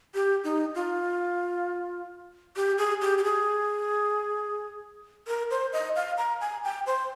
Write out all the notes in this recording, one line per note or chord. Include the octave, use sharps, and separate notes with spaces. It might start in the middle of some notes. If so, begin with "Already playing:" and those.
G4
D#4
F4
G4
G#4
G4
G4
G#4
A#4
C5
D#5
F5
A#5
G#5
G5
C5